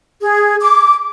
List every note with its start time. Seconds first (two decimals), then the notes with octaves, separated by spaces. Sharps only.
0.22 G#4
0.59 D6